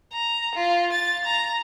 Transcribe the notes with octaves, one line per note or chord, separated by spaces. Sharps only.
A#5
F4
A6
A#5